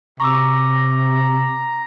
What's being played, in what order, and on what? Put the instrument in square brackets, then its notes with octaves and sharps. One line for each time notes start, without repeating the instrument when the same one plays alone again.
[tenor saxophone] C3 [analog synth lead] A#5 [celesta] C#6 D6 E6